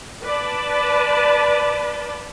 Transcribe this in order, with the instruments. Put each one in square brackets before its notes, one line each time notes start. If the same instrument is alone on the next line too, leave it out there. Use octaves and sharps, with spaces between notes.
[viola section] B4 D5 A5